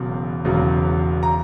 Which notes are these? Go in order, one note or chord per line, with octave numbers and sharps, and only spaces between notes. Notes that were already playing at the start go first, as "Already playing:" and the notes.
Already playing: E1 E2 C#3 F#3
E1 E2 C#3 F#3
A#5